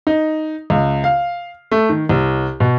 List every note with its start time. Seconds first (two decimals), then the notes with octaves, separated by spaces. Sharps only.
0.07 D#4
0.70 C#2
1.04 F5
1.72 A3
1.89 D#3
2.09 C2
2.60 B2